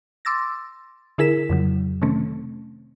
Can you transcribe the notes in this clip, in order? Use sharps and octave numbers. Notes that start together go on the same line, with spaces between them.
C6 D6 E6 A6 A#6
D3 E4 G#4 A#4 B6 E7
F2 C#3 F#3
C3 D#3 A3 C4 C#4